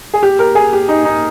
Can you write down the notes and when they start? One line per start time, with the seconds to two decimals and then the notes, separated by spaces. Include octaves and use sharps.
0.14 G#4
0.23 G4
0.39 A#4
0.55 G#4
0.73 G4
0.88 D#4
1.05 D#4